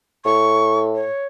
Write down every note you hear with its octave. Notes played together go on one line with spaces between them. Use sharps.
A2 C#6
C#5